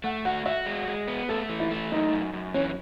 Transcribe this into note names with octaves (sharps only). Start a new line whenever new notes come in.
A3 F#5
F#4 F#5
F#4 E5
G#3
G#3
B3
A3 A4
E3
E4
A3
F#2 D#4
F#2
F#2
E3 C#4